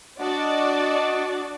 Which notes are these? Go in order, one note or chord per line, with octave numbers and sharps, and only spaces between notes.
D4 F#4 D5 D#5 F#5